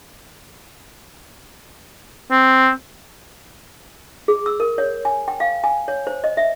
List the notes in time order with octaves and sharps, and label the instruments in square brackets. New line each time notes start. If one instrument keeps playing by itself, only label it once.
[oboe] C4
[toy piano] G#4
E6
A#4
C#5
G#5
G5
F5
G#5
C#5
C5
D#5
E5